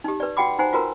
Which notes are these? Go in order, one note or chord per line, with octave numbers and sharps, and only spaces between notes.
D#4 G4
B4 D5
F#4 F#5 G5 B5 D6
D#4 C5 F#5 G#5 A#5
F4 F#4 A#4 B4 A#5